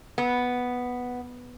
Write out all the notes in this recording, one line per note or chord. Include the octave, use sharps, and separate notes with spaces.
B3